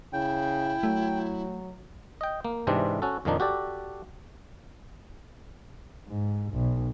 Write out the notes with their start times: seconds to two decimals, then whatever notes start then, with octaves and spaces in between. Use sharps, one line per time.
0.13 C#3 E4 G5
0.83 F#3 A3
2.21 D#5 G5
2.45 A#3
2.67 G#2 C3 E3 C4 D4
3.02 C#4 F#4 A4
3.25 F2 A#2 D#3 F3 D4 D#4
3.40 F#4 G4 A4 D5
6.08 G#2
6.53 B1